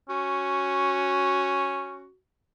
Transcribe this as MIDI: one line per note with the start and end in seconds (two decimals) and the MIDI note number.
0.09 2.07 61
0.09 2.17 66